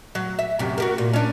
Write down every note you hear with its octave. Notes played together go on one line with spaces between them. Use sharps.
F#3
E5
F#2 C3
F#4 G4 A#4
A#2
C#4 D4